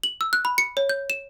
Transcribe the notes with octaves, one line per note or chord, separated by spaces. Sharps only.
F#7
E6
F#6
B5
C#7
C#5
G6
E7